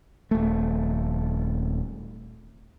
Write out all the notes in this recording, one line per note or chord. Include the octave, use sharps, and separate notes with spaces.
D#1 A3